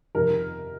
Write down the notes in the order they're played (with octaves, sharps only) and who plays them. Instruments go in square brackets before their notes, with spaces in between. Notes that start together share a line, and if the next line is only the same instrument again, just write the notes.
[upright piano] F2 C3 D#3 A#4